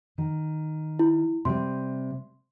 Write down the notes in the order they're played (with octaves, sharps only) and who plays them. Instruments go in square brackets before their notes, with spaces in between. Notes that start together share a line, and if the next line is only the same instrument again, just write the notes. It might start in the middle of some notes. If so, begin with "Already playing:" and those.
[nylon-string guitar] D#3
[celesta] E4
[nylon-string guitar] C3 G3 [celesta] C6